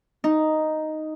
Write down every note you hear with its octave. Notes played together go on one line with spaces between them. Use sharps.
D#4